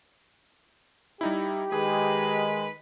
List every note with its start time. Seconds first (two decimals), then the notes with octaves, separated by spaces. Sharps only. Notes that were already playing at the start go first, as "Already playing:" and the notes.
1.21 G3 D#4 E4 G4
1.72 D#3 G#3 G#4 B4